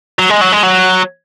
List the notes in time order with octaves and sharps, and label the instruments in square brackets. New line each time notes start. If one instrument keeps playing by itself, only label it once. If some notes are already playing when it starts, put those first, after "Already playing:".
[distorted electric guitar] F#3
G#3
F#3
G#3
F#3